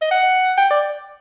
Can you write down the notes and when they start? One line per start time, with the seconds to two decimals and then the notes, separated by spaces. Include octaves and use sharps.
0.02 D#5
0.11 F#5
0.57 G5
0.71 D5